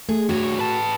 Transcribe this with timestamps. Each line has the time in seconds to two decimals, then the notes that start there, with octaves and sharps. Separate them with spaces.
0.09 A3 G#4
0.29 G2 F#4 C#5
0.59 B4 A5